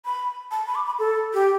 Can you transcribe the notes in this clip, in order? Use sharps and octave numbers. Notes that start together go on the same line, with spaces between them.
B5
A5
B5
D6
B5
A4
G4